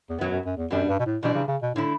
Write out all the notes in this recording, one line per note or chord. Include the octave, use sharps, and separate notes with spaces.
E2
F#2 B2 F#3 B3
F#2
F#2
E2
F#2 B2 G3 D4
G2
B2
A2
F#2 B2 E3 G3 D4
C#3
C#3
B2
A2 D3 A3 E4